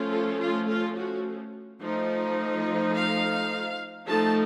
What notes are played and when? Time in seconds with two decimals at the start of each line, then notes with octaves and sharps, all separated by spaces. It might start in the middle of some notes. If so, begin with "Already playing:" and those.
Already playing: F3 A3 C#4 F4
0.11 A4
0.40 F4
0.68 F4
0.97 F#4
1.81 F3 A3 D#4
2.95 F5
4.07 F3 A3 D#4 A5